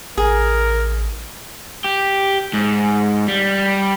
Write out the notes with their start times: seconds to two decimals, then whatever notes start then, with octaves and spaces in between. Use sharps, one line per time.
0.17 A1 G#4 A#4
1.84 G4
2.53 G#2
3.28 G3